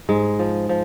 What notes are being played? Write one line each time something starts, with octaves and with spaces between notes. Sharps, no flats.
G#2 G#3
F3
F3